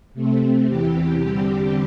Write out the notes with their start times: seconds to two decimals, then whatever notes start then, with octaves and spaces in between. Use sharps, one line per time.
0.14 C3 A3 C4
0.66 E2 C3 E3 G4
1.20 E2 D3 G3 C4